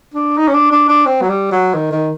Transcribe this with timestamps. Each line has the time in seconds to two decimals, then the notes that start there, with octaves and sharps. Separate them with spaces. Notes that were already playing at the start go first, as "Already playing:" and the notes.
0.14 D4
0.37 D#4
0.47 C#4
0.53 D4
0.72 D4
0.88 D4
1.06 C4
1.21 F#3
1.29 G3
1.51 F#3
1.74 D#3
1.91 D#3